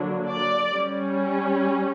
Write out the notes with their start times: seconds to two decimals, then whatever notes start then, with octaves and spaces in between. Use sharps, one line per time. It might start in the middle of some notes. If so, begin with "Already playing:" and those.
Already playing: D3 F#3 A#3 D4
0.29 D5
0.74 G3 C#4